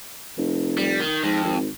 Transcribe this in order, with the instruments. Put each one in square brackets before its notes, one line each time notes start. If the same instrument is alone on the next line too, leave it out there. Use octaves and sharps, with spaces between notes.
[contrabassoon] F1
[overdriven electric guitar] G3
D#3
[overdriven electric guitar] F2 [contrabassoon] G#2
[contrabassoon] G#1